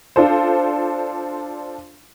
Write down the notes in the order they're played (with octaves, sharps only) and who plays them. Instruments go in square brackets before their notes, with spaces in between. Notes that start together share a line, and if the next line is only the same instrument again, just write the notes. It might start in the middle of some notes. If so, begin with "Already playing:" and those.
[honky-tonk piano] D4 F4 A4 C5